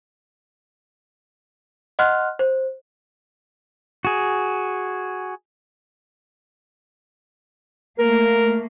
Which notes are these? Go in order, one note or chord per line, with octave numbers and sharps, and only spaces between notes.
D#5 F#5 C6 F6 F#6
C5
F#4 G#4
A3 A#3 A#4